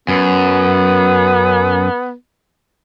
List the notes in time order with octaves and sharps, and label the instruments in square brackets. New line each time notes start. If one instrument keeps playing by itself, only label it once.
[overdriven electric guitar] F#2 [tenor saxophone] B3